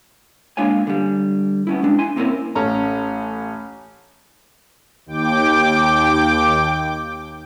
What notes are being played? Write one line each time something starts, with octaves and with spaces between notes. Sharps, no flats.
G#3 A#3 D4 F4 C#5 G#5
D3 G3
B3 C#4 E4
G#3 D4
E4 G#5 C6
A#3 C4 C#4 E4 A#4 C5
A1 C#4 A#5
D#2 G5 D6